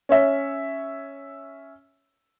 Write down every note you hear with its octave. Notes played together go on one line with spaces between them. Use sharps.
C#4 C#5 E5